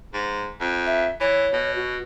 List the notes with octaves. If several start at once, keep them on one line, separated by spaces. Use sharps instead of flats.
G#2
F2
E5
E3 C#5
B2
F#4